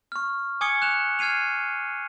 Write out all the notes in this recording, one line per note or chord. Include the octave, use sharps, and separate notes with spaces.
C#6 F6
G#5 D6 D#6 G#6 C#7 G7
F#6 E7 F7
F6 G#6 C7 D#7 F7